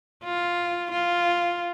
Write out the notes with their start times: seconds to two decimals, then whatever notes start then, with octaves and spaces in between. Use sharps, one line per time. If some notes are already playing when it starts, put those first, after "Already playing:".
0.24 F4
0.91 F4